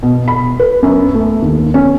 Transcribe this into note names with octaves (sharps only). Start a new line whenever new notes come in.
B2
B5
B4
F#2
A3
D#2
C#4